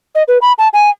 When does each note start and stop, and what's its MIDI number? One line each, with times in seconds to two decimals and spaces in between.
0.15 0.23 75
0.28 0.38 71
0.42 0.53 83
0.58 0.68 81
0.73 0.90 80